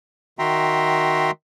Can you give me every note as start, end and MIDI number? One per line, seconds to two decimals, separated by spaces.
0.39 1.31 51
0.39 1.31 66
0.39 1.31 76
0.39 1.31 79
0.39 1.31 82
0.39 1.31 84